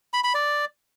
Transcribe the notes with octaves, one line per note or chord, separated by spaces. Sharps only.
B5
B5
D5